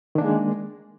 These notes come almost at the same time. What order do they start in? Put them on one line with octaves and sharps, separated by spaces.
D#3 D4 A#3 G#3